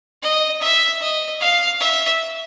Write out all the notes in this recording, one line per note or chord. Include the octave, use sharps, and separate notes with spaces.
D#5
E5
D#5
F5
E5